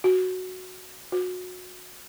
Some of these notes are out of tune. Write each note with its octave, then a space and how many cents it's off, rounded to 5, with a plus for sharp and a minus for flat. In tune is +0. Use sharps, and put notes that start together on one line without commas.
F#4 +0
F#4 -25